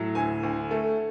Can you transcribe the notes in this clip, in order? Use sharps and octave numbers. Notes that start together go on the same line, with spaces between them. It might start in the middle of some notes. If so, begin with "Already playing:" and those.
Already playing: A2 F#3
D2 G#5
D2
A3